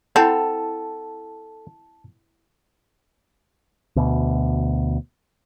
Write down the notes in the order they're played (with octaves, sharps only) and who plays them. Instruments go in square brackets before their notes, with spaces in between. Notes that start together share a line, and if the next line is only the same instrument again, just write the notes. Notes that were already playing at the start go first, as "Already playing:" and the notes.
[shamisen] C4 [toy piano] E4 F#5 B5 [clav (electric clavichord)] A4 [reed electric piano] A5
[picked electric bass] D2 B2